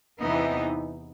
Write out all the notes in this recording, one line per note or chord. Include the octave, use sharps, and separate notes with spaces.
E2 C3 E3 B3 D#4